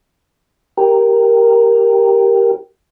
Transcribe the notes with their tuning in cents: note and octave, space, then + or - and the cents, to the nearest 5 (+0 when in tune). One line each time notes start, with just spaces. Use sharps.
G4 +0 A#4 +0